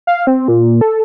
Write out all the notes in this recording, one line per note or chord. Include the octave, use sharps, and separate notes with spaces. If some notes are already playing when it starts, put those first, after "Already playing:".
F5
C4
A#2
A4